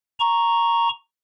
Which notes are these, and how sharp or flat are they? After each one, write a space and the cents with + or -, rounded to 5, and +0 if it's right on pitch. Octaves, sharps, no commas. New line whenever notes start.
A#5 +0 C#6 +0